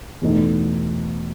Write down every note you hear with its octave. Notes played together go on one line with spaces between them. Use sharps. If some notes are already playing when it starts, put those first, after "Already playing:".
E2 B2 A3 D#4